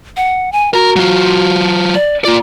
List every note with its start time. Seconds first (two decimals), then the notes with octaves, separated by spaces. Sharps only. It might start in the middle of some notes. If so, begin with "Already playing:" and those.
0.17 F#5
0.52 G#5
0.74 F#4 A#4 A#5
0.96 F#3 F4
1.94 D5
2.25 A#3 F4 D5